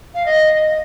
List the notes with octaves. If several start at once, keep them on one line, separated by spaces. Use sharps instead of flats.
F5
D#5